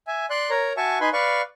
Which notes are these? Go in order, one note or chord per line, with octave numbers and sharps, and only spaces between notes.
E5 G#5
D5 C6 F#6
A#4 C#5 A#5
F#4 E5 G#5 A5 C#6
D#4 B4 G#5 B5 C6
B4 D5 F5 C#6